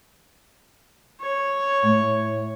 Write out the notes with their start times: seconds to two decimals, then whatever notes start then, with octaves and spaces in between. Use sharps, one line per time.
1.21 C#5
1.83 A2